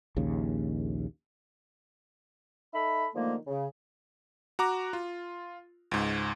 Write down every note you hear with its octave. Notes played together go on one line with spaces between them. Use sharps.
A#1 D#2 C#3
D#4 A4 E5 B5
D3 D#3 F3 A3 A#3
C#3
F#4 A#5 D6
F4
C#2 G#2